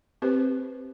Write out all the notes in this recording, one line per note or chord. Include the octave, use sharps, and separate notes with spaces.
C4 G4 B4 C5